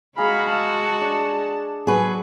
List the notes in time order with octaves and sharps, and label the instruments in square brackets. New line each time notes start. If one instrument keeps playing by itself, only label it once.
[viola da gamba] G#3 F#4 [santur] G#4 A#5 [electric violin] F5 B5
[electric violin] A5 [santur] E6
[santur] D4
[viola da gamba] F#3 [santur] F#4 [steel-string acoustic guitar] G#4 B4